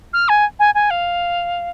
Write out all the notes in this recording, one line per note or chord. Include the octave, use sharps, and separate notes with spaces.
F6
G#5
G#5
G#5
F5